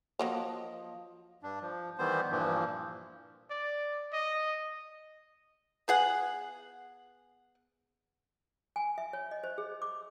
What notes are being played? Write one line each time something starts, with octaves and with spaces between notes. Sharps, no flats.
F3 F#3 A#3 C#5 D#5
G2 D4
F3
D#3 E3 G3 B3 C5
G2 A#2 E3 F3
D5
D#5
B3 G#4 F#5
G#5
E5
C#5
D#5
C5
G#4
D6